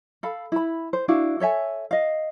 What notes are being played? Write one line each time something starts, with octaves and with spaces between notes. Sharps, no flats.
A4 F5 B5
E4 B5
C5
D4 E4 F#4 F5
A4 C#5 E5 G#5
D#5 F5